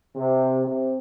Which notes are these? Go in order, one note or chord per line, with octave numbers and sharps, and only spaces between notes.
C3
C3